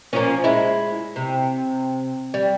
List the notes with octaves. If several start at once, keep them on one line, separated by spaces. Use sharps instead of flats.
A#2 F3 C#4
G#3 E4
C3
G3